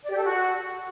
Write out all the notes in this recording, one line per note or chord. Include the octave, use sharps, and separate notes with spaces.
D5
G4
A4
F#4